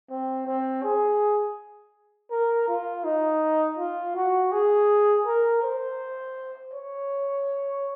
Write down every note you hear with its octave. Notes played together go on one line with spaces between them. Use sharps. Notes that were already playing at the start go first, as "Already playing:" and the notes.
C4
C4
G#4
A#4
F4
D#4
F4
F#4
G#4
A#4
C5
C#5